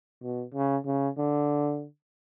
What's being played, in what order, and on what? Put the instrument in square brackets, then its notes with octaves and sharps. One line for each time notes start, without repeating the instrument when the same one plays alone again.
[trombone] B2
C#3
C#3
D3